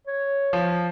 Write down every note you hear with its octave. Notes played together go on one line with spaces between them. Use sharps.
C#5
F3